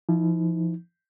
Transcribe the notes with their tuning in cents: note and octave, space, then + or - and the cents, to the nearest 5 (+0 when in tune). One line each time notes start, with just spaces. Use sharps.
F3 -35 D#4 +35